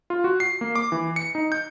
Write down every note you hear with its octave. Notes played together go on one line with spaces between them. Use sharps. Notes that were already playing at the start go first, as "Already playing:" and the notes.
F4
F#4
C7
A#3
D6
E3
C#7
D#4
G6